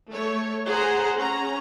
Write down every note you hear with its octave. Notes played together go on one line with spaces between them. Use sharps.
A3 C#5
G#4 C5 F#5 A#5
C#4 A#5